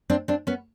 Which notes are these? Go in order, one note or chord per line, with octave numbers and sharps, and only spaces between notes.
C4 D4
C4 D4
B3 C#4